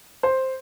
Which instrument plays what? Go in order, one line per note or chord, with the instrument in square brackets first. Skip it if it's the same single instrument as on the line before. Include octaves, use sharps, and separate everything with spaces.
[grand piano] C5